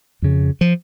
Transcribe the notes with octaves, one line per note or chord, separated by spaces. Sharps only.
F2 C#3
F3